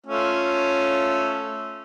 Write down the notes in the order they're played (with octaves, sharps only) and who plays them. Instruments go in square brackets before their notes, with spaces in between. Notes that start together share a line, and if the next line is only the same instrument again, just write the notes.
[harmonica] A3 C#4 F4